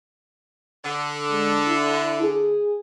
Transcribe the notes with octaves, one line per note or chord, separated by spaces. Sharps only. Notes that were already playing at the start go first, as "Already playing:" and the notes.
D3
G#3
E4
G#4